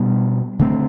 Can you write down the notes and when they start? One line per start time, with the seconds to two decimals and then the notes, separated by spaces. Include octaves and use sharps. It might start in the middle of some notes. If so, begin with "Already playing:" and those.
Already playing: B2 G3 B3 D4
0.59 D3 A3 C4